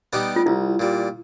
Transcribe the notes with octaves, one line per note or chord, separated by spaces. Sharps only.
G3 B3 D#4 G4
F4
C2 E4
A#2 G3